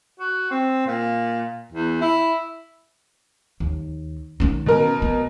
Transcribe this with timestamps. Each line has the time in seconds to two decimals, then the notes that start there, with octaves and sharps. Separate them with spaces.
0.19 F#4
0.51 C4
0.86 A#2
1.72 E2
2.01 E4
3.60 D#2
4.40 D#3 C#4
4.66 B2 A#4
5.02 B3